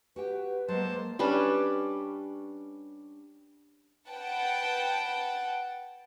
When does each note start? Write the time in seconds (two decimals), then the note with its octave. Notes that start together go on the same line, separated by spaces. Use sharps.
0.16 F#4 G4 B4 G5
0.68 F#3 G#3 A#3 C5 A5
1.19 G3 C#4 D4 B4
4.10 B4 F#5 G5 A5